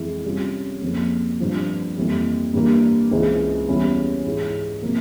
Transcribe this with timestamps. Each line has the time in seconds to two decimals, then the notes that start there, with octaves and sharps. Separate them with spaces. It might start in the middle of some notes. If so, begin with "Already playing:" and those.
Already playing: F2 E3 G#3 E4
0.25 C3 G3 C#4 F4
0.82 F2 C#3 F3 A#3
1.39 G2 F3 C4 F4
1.96 F2 E3 G3 A#3
2.54 G2 E3 G3 A#3
3.11 C#2 C#3 E3 G#3 C4
3.68 E2 C#3 G3 C#4 E4
4.25 G#2 E3 G#3
4.82 C3 F3 A#3